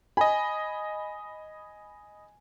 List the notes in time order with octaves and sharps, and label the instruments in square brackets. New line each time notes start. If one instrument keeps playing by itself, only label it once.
[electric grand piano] D#5 B5 [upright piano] G#5